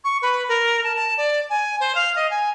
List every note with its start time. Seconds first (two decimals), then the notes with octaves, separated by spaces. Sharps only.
0.04 C#6
0.22 B4
0.48 A#4
0.83 A5
0.96 A5
1.17 D5
1.49 G#5
1.80 C5
1.95 F5
2.16 D#5
2.30 G#5